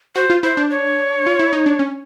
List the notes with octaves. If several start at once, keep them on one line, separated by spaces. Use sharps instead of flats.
F#4 C5
F4
E4 C5
D4
C#5
F4
E4
D#4
D4
C#4